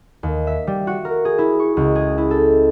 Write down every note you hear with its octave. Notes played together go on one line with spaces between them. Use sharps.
D#2
E5
G3
F#4
A#4
G#4
E4
C#6
C#2
G#4
E4
A4